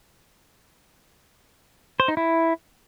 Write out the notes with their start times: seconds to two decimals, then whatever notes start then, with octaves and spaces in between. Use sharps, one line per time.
2.00 C5
2.08 D#4
2.17 E4